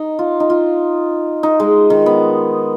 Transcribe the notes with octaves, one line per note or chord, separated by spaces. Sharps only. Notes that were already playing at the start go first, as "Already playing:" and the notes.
Already playing: D#4
F4
D#4
F4
D#4
G#3
D#3
B3